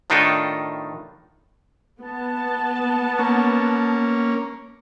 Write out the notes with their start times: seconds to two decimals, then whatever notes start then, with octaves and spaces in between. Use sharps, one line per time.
0.10 A2 D#3 D4 D#4 F4 A4
2.01 B3 A5
3.19 A#3 C#4